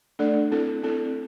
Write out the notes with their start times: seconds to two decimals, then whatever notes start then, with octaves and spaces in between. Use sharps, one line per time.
0.19 A3 D4 A4 D5
0.52 C4 E4 A4
0.83 C4 E4 A4